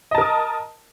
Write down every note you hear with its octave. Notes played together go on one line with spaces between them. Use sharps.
A#4 D#5 A5 D#6